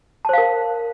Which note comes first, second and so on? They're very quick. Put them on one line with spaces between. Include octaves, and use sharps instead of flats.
A5 C5 F5 A#4